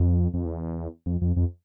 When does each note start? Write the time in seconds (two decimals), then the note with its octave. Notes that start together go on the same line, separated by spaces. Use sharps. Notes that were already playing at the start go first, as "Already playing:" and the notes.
Already playing: F2
0.34 F2
0.45 E2
1.06 F2
1.22 F2
1.36 F2